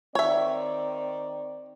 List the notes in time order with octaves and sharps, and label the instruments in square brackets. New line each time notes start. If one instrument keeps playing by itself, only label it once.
[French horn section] D#3 C4 D5 [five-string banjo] C#5 E5